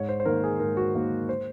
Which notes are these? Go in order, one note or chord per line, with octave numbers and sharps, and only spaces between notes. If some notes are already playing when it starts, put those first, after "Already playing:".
Already playing: G#2 C#5
C5
C5
D#3 A#3 A#4
G#4
G#2 A#4
F#4
D#3 A#3
C5